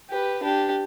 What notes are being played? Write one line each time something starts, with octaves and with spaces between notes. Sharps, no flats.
G4 B4
D4 G4